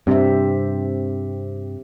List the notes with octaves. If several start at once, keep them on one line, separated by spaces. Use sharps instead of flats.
G2 C3 C4 G4 E5